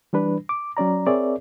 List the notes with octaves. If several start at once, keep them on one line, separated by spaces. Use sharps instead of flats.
E3 G3 D4 B4
D6
F#3 C#4 D5 A#5
C4 G#4 A#4 C#5 D5 E5